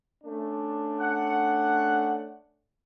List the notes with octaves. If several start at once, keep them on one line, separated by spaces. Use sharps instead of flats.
A3 C#4 D4
F#5